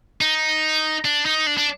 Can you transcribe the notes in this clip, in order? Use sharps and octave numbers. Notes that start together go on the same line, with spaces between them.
D#4
D4
D#4
D4
D4